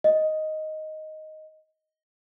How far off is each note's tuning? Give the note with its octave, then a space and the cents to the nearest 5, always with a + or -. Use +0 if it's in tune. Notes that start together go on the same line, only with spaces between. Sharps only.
D#5 +5